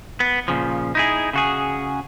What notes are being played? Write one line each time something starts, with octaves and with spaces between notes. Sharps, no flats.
B3
A#2 C#3 F3
D#4 E4 G#4
C#3 F#4 G#4